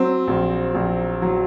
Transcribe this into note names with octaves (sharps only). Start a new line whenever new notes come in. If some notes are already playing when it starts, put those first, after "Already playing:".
Already playing: F#3 C4
A#1
A#1
F#3